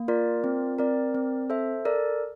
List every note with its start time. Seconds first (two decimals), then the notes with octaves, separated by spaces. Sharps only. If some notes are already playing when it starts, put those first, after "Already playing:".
Already playing: A#3
0.08 F4 A#4 D5
0.44 C4
0.79 C4 A#4 D5
1.15 C4
1.50 A4 C5 E5
1.85 A4 A#4 D5